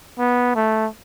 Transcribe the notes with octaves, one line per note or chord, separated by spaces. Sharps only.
B3
A3